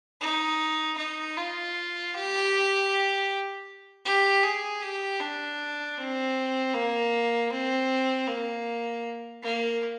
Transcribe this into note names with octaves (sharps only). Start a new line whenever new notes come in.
D#4
D#4
F4
G4
G4
G#4
G4
D4
C4
A#3
C4
A#3
A#3